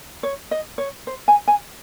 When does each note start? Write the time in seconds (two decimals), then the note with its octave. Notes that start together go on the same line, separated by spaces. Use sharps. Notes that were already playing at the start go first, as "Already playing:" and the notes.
0.23 C#5
0.51 D#5
0.78 C#5
1.07 C5
1.28 G#5
1.48 G#5